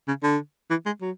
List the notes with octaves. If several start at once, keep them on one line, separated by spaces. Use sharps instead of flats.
C#3
D3
E3
G#3
F#3